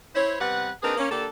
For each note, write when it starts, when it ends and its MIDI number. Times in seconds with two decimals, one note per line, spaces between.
0.14 0.35 64
0.14 0.35 72
0.14 0.35 73
0.40 0.70 48
0.40 0.70 55
0.40 0.70 59
0.40 0.70 71
0.40 0.70 78
0.83 0.97 60
0.83 0.97 62
0.83 0.97 63
0.83 0.97 68
0.83 0.97 70
0.83 0.97 71
0.97 1.08 58
0.97 1.08 61
1.10 1.26 50
1.10 1.26 58
1.10 1.26 62
1.10 1.26 67
1.10 1.26 69